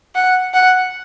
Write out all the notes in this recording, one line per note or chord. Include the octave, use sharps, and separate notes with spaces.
F#5
F#5